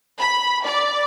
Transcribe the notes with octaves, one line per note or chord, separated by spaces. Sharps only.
B5
D5